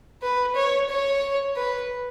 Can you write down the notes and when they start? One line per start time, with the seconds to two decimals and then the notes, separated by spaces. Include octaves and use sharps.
0.22 B4
0.56 C#5
0.89 C#5
1.56 B4